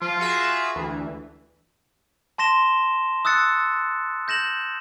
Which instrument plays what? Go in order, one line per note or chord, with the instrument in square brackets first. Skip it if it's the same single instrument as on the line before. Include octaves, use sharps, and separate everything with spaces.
[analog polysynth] F3 [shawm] F4
[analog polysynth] F#4 G#4 E5
D2 E3
[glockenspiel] A5 C6 A#6 E7 G7
D#6 E6 F#6 A6 C#7
G6 A#6 E7 F#7